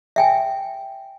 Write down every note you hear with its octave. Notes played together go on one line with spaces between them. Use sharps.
E5 G5 G#5